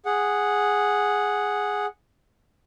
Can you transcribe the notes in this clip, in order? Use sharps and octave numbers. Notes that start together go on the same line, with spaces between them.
G#4 F#5